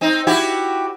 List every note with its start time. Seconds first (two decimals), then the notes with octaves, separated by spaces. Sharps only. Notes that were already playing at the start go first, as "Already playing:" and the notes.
0.01 C4 D#4
0.27 E4 F#4 G4